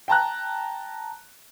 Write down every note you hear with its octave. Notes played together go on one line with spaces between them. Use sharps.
G5 A5 A#5 F#6